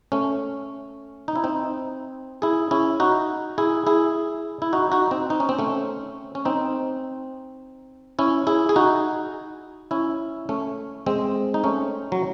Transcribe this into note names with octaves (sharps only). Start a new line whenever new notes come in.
A3 C#4
D#4
E4
C4 D#4
E4 G#4
C#4 E4
D#4 F#4
E4 G#4
E4 G#4
E4
D#4 F#4
D#4 F#4
C4 D#4
D#4
C#4
C4
A3 C#4
C#4
C4 D#4
C#4 E4
E4 G#4
G#4
D#4 F#4
C#4 E4
A3 C#4
G#3 C4
D#4
A3 C#4
F#3